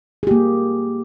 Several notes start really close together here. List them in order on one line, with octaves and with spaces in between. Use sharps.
G#4 G4 A#3